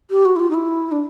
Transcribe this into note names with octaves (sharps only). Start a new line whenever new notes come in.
G4
F#4
E4
F4
D#4
E4
D4